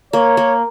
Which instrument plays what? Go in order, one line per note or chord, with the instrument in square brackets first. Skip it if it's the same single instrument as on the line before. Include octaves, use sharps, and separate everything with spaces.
[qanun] A#3 [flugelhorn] C#5
[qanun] A#3